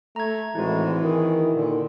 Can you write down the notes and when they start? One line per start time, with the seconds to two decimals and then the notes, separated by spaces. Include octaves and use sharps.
0.16 A3 A#5 G#6
0.55 G#1 A2 E3 G#3 E4 F#4
1.03 D#3 G#4
1.52 A#2 D3